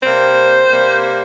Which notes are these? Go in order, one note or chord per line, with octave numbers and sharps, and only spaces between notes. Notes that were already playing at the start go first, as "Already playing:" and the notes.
C3 G3 A#3 C5
C3 G3 A#3